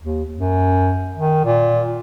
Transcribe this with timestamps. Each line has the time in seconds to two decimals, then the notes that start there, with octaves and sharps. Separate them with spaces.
0.01 D#2
0.34 F#2
1.17 D#3
1.45 A#2